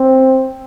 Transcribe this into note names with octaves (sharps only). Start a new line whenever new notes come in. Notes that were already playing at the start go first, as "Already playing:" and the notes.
Already playing: C4